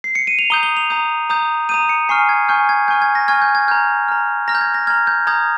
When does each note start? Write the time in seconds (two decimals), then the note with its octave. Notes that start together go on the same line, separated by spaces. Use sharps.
0.04 C7
0.15 C#7
0.27 D#7
0.39 F7
0.50 A#5 D#6 G6 G7
0.63 G7
0.77 F7
0.90 A#5 D#6 G6
1.30 A#5 D#6 G6
1.69 A#5 D#6 G6 D#7
1.89 C#7
2.09 G#5 C#6 F6 C7
2.29 G#6
2.49 G#5 C#6 F6 G6
2.69 G#6
2.88 G#5 C#6 F6 G6
3.02 G#6
3.15 A#6
3.28 G#5 C#6 F6 G#6
3.42 G6
3.55 G#6
3.68 A#5 F6 G6
4.08 A#5 F6
4.48 A#5 F6 A#6
4.55 G6
4.61 G#6
4.74 A#6
4.87 A#5 F6 G#6
5.07 G6
5.27 A#5 D#6 G6 G#6